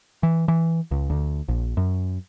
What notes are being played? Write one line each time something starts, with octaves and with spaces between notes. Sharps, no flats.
E3
E3
C#2
D2
A#1
F#2